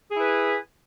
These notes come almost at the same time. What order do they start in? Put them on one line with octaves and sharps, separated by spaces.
G#4 E4 B4